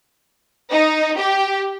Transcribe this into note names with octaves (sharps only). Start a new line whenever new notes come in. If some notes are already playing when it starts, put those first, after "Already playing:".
D#4
G4